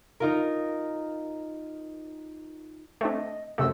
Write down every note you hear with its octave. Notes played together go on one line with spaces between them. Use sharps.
D#4 F4 A#4
A3 C4 D4 D#5
F#2 C3 A3 D#5 C6 E6